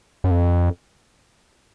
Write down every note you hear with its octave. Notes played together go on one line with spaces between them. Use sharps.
F#2
F2